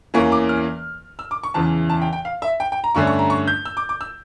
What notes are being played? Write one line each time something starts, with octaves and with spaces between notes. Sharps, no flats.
E2 E3 A#3 C#4 C#6
D6
F6
E6
D6
C#6
E2 C#3 E3 A5
A5
G5
G5
F5
E5
G5
G5
A#5
G2 D3 A3 C#4 C#6
C#6
A#5
C#6
G6
E6
D6
D6
E6